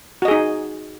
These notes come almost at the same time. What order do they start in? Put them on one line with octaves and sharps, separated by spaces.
F#4 D#5 G#4 D#4